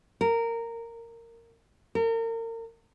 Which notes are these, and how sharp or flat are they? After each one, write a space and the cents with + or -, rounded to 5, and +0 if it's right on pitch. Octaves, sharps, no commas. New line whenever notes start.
A#4 -15
A#4 -35